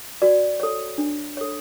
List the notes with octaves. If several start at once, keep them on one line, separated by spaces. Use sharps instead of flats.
F#4 D5
A4 C#5
D4
A4 C#5